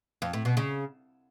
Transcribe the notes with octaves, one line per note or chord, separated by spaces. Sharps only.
F2
A2
B2
C#3